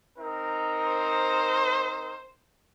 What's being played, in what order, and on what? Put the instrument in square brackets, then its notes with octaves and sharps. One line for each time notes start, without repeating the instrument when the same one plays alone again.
[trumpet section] C4 D#4 A#4
[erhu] C5